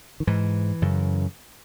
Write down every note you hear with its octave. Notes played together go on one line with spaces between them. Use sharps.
D#3
G#2 E3
F#2 C#3